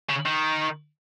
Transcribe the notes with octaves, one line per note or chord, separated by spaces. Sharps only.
C#3
D#3